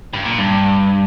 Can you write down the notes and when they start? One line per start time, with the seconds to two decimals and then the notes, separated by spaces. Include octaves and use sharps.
0.14 G2
0.25 A#2
0.38 G2